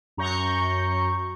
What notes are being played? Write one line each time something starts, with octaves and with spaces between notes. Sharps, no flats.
F#2 A#5 C#6 G6